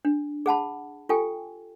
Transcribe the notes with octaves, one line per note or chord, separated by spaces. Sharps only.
D4
G#4 F#5 A5 B5
F4 G4 A4 G5 G#5